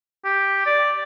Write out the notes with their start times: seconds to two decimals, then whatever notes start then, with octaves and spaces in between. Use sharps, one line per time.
0.25 G4
0.66 D5